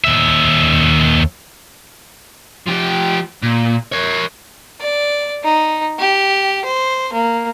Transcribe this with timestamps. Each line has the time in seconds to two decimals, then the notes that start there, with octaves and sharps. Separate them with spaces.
0.04 D#2 E5
2.66 F3 G4
3.43 A#2
3.92 A#4 C#5
4.80 D5
5.44 D#4
5.99 G4
6.65 C5
7.13 A#3